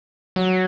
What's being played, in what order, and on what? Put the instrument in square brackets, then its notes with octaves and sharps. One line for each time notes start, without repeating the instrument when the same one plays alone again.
[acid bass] F#3